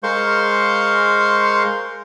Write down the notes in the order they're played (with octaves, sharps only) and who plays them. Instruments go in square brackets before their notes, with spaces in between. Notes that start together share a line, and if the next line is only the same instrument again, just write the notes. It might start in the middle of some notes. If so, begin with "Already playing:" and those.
[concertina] G#3 A#4 C5 F5 C6 C#6